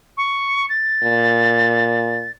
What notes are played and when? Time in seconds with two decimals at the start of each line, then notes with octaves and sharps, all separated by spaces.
0.17 C#6
0.69 A6
1.04 A#2